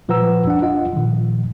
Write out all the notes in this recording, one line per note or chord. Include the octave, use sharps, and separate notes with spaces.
A#2 F3 B4 F#5 A#5 E6
D4 F#5
F4 D#5 F#5
A#2 D#3 F3